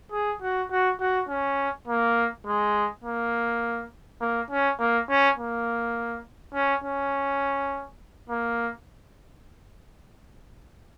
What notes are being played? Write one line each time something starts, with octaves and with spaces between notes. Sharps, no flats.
G#4
F#4
F#4
F#4
C#4
A#3
G#3
A#3
A#3
C#4
A#3
C#4
A#3
C#4
C#4
A#3